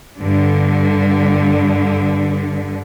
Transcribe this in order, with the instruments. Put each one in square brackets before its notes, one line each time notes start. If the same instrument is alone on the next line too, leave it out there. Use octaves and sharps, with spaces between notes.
[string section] G2 D3